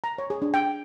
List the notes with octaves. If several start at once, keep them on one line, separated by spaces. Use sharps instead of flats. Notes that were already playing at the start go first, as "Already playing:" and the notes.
A#5
C#5
G#4
D4
G5